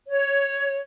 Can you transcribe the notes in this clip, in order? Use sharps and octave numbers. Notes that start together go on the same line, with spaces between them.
C#5